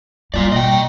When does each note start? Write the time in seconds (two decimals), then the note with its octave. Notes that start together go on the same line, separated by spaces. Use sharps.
0.34 G3 A#3 F4 D5
0.52 B2 D#5 G5